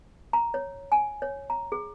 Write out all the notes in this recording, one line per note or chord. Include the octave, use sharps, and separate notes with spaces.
A#5
C#5
G#5
C#5
A#5
G#4